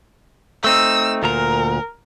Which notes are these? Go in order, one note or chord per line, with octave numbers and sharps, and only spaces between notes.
A3 C4 D#4 E6
D2 A#2 A#4 A#5